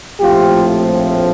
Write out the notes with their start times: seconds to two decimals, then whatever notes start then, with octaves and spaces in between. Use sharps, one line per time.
0.19 A#1 A2 F3 A3 C4 F4 G4